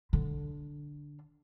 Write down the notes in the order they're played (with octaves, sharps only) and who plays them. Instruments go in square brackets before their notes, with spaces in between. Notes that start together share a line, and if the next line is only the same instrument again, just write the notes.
[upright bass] D3 D4